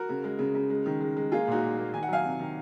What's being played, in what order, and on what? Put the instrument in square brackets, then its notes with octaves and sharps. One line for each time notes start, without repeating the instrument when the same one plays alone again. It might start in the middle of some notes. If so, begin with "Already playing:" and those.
Already playing: [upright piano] F#4 A#4
C#3
G#3
C#3
C#3
G#3
D#3
G#3
G#3
A#3 F4 G#4
A#2 D#4 F#4
A#2
A#3
D#3 G#5
F#5
F#3 F5 G#5
C3
D#3